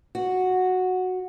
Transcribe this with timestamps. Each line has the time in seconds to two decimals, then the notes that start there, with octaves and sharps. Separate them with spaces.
0.15 F#4